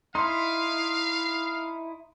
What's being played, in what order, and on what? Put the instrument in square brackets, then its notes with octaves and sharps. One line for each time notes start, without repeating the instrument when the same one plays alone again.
[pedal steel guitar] D#4 E4 [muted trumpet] F5 [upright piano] C6